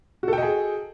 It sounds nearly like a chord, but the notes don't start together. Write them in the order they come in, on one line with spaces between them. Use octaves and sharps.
F#4 A4 G5 D#5 G#4